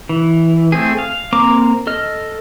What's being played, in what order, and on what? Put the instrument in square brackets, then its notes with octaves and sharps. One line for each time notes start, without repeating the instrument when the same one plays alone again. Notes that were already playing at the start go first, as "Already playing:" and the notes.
[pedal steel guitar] E3
A3 C4 G#4
F5
A#3 C4 A#5 D6
A4 D#5 F6